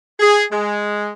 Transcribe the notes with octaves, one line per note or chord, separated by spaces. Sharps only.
G#4
G#3